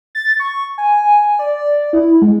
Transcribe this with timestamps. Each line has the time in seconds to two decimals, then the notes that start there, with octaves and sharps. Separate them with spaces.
0.15 A6
0.40 C#6
0.78 G#5
1.39 D5
1.93 E4
2.22 G#3